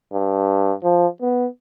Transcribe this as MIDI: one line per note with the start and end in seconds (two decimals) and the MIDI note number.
0.13 0.73 43
0.84 1.07 53
1.22 1.46 59